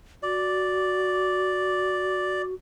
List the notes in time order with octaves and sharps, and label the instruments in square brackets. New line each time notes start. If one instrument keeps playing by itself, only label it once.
[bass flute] F#4 [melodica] D5